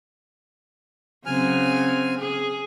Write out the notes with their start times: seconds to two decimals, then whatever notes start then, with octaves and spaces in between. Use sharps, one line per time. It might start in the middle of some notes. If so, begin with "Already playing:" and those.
1.26 C#3 F#3 C4 G#5 F6
2.19 G#4